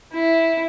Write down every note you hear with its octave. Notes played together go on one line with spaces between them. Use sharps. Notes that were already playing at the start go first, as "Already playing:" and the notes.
E4